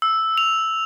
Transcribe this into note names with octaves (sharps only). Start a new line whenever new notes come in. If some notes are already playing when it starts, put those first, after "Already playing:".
E6
F7